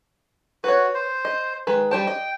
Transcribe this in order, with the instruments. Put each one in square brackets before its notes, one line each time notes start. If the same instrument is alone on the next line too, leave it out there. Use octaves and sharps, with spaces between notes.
[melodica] F#4 [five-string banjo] B4 C#5
[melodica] C5
[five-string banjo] D#5
D#3 G#3 B4
[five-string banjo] G3 C5 A5 [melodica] G5
[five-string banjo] D#5